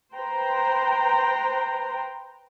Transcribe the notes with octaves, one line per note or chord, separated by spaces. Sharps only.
B4 C5 G5 A#5